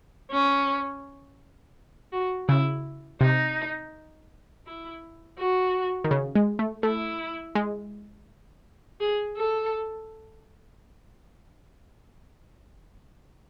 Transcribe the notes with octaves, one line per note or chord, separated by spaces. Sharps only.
C#4
F#4
C#3 E4
C3 D#4
E4
F#4
D#3
C#3
G#3
A3
A3 E4
G#3
G#4
A4